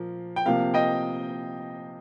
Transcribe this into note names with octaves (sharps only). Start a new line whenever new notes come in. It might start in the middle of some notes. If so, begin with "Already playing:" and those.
Already playing: A#2 F3 A#3
G5
C3 F3 A#3 F5
D#5 G5